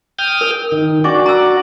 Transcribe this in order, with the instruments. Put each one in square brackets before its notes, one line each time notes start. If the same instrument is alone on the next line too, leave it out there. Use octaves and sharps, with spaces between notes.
[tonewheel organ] G5 D#6 F6
[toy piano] A#4
[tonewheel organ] D#3
[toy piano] D4 C#6 D6 [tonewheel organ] F#4 D5
[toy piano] A#5 E6